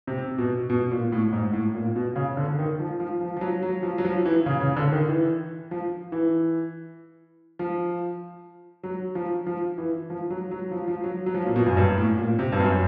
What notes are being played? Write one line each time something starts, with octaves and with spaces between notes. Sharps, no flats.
C3
B2
B2
A#2
A2
G#2
A2
A#2
B2
C#3
D3
D#3
F3
F3
F3
F3
F#3
F#3
F3
F#3
F3
E3
C#3
C#3
D3
D#3
E3
F3
E3
F3
F#3
F3
F3
E3
F3
F#3
F#3
F3
F3
F#3
F#3
F3
A#2
B2
F#2
G2
A2
A#2
C3
G2
F#2